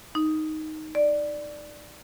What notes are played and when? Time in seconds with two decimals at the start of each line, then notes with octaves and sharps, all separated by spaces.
0.15 D#4
0.95 D5